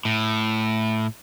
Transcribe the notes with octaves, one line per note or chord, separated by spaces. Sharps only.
A2